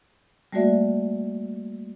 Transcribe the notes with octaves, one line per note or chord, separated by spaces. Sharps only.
G3 A3 A#3 F#4 D5 E5